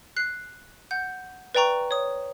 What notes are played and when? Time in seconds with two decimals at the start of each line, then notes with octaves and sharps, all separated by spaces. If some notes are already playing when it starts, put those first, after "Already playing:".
0.16 F#6 C7
0.91 F#5 G6
1.55 B4 D5 G5 A#5 C#6
1.91 C#5 D#6